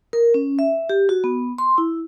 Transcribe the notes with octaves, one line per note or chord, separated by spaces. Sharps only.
A#4
C#4
E5
G4
F#4
B3
C6
E4